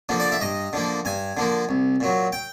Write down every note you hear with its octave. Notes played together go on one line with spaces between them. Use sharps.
D3 F3 A#3
D5
E5
G2 D#5
D3 F3 A#3
G2 G#5
D3 F3 A#3
C2
A#2 F#3
G5